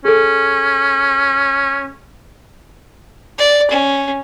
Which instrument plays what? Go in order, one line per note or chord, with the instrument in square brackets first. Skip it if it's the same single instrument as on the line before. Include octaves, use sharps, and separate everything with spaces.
[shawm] C#4 [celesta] G#4 A4
[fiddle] D5
C#4